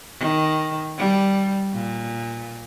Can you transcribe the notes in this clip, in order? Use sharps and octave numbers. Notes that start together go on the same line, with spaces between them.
D#3
G3
A#2